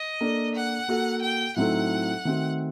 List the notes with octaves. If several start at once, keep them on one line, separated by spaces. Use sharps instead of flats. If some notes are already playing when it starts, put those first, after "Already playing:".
Already playing: D#5
A#3 D4 A4 D5
F#5
A#3 F#4 A4
G5
A2 F#3 C4 D#4 A4 F#5
D#3 A3 C4 F#4